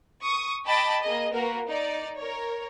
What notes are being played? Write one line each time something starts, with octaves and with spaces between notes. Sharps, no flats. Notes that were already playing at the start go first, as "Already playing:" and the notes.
C#6 D#6
D#5 G5 A5 B5 D6
A#3 G#4 D#5
A#3 F#4 A#4 B4
D#4 D5
A#4 C#5